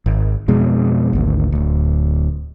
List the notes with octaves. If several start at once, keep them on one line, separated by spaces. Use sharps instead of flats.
G#1
F2 B2 G#3
G#1 D2
D1 D2